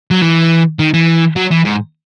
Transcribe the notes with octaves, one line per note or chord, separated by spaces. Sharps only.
F#3
E3
D#3
E3
F#3
E3
G#2